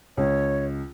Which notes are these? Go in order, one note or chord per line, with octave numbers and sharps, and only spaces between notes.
C#2 C#5